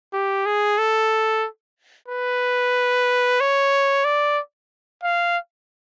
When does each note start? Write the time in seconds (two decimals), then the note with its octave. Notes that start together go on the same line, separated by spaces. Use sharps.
0.13 G4
0.46 G#4
0.78 A4
2.08 B4
3.40 C#5
4.05 D5
5.03 F5